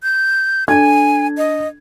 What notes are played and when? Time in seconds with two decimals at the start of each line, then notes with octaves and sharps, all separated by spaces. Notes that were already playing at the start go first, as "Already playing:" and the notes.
0.03 G6
0.68 D4 A4 G#5 G#6
1.38 D#5